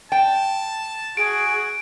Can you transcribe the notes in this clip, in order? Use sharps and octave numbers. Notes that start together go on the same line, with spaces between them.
G5 A5
F#4 G#4 D7